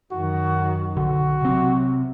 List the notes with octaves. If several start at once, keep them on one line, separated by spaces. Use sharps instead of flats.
F#2 D#3 F#4
B1 D3 F#4
C3 F#3 C4